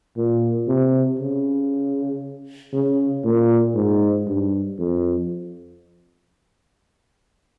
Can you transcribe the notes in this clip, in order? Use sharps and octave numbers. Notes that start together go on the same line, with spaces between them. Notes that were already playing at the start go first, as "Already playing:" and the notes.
A#2
C3
C#3
C#3
A#2
G#2
G2
F2